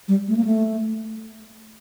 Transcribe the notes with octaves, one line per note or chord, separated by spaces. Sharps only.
G3
A3
A#3
A3